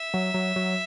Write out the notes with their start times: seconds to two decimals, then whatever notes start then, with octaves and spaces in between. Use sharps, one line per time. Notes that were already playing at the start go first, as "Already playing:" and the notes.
Already playing: E5
0.14 F#3
0.34 F#3
0.56 F#3